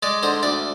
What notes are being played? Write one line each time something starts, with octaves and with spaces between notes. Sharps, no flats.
G#3 D5
D3 C5
D2 D5